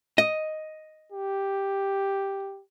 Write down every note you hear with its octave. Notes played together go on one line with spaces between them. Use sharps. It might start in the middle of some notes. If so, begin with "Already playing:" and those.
D#5
G4